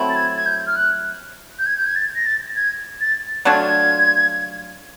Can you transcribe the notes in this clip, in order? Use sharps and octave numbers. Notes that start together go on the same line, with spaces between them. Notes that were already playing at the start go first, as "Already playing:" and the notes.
Already playing: F#3 A3 C4 E4
A6
G#6
G#6
G6
F6
F#6
G6
G#6
G6
G#6
A6
A#6
A6
G#6
A6
F#3 A3 D4 F4 G#6